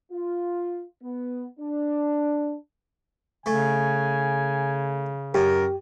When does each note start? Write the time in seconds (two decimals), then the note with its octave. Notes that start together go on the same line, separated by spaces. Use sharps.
0.12 F4
1.03 B3
1.60 D4
3.46 C#3 A3 G#5
5.34 F#2 G4 A#4